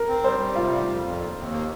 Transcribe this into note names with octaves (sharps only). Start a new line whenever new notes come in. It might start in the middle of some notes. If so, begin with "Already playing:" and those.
Already playing: A#4
C4
G3 C5
G3
C3 F4 F5
G3
F2
F2
D#2
D#2
A#3